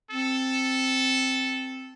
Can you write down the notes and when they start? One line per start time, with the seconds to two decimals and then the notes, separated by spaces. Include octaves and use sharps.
0.11 C4 A4